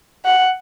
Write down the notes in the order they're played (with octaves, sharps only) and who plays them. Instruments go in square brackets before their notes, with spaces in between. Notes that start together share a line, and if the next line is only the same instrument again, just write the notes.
[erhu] F#5